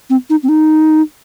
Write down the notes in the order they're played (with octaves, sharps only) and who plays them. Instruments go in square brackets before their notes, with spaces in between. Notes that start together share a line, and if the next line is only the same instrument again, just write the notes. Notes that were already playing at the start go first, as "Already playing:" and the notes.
[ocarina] C4
D#4
C4
D#4